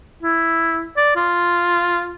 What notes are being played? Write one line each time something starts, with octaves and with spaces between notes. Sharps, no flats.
E4
D5
F4